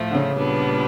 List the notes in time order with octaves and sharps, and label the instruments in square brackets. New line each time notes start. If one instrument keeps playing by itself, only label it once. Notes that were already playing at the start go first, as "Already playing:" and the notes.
Already playing: [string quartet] A2 F3 A3
[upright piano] D3
C#3
[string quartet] A#2 G3 B3 D4